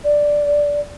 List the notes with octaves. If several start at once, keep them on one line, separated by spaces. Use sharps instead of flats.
D5